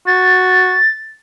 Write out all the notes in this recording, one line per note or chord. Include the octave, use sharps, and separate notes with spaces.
F#4 A6